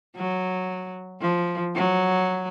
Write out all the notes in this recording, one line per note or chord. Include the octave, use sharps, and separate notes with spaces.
F#3
F3
F#3